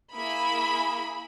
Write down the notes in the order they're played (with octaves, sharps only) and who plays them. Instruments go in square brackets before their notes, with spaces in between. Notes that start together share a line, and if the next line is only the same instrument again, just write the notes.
[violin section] A#3 E4 G#4 B5